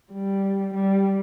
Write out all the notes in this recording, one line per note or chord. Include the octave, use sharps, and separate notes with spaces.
G3
G3